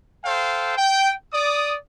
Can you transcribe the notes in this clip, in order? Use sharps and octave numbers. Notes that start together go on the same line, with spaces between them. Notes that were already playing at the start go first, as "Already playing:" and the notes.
A4 C5 F5 G5
G5
D5 D#6